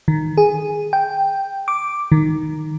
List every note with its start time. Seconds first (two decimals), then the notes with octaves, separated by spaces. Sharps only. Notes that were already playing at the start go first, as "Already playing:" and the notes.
0.08 D#3
0.37 G#4
0.93 G5
1.68 D6
2.12 D#3